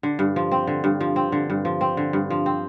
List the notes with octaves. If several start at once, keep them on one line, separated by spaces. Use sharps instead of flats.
D3
G2
F3
C4
D3
G2
F3
C4
D3
G2
F3
C4
D3
G2
F3
C4